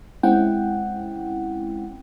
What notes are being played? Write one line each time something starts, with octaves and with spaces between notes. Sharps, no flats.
G#3 C4 C#4 E4 F#5 G5